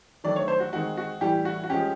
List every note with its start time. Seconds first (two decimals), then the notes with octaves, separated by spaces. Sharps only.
0.24 D#3 F#3 A3 D4 D5
0.36 C#5
0.48 C5
0.60 F#4
0.72 D#3 G#3 C4 D#4 F#4
0.97 F#4
1.21 A2 E3 G3 G4
1.45 F#4
1.64 F#4
1.70 F3 G#3 C#4 G4